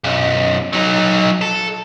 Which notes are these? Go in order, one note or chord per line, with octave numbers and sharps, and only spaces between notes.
B1 F#2
F#3 D#4
A4